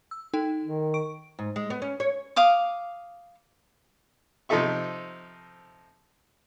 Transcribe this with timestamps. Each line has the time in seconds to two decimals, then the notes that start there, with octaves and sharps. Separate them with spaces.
0.11 E6
0.33 D#4 A4 G5
0.64 D#3
0.94 C#6 D7
1.39 G#2
1.56 G#3
1.70 B3
1.82 C#4
2.00 C#5
2.36 F5 D6 D#6
4.49 C3 F3 D#4 A4 E5 C#6